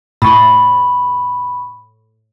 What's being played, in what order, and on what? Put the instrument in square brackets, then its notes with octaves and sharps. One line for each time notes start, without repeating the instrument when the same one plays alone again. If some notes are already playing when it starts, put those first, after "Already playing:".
[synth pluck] A2 D#6 A6 [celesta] B5 C#6